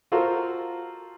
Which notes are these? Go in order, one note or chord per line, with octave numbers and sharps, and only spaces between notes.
F4 F#4 A4 A#4 C5 F5